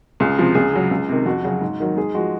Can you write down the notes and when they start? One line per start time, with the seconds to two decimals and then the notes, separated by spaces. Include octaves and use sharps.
0.20 C#2 G#4
0.38 C3 F3
0.55 C#2 G#4
0.73 C#3 F#3
0.91 C#2
1.09 C3 D#3
1.26 F2 F#4
1.44 C#3 F#3
1.61 G#2
1.80 D#3 F#3
1.97 G#2 G#4
2.14 F3 G#3 F#4